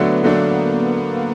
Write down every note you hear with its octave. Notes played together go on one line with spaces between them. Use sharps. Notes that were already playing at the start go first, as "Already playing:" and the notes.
Already playing: D3 F#3 A3 B3 D4
D3 F#3 A3 A#3 D4